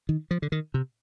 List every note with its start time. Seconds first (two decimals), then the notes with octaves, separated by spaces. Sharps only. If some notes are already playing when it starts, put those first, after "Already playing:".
0.09 D#3
0.31 F3
0.42 D3
0.52 D#3
0.74 C3